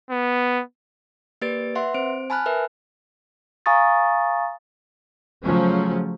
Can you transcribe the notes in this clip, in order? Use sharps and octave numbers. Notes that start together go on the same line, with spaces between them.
B3
A#3 G4 B4 D5 A6 D7
B4 E5 F#5 C6
C4 C5 D7
G#5 A5 B5 F6 F#6
A#4 B4 E5
F5 G#5 A#5 C#6 D#6 A6
C#3 F3 F#3 A3 C#4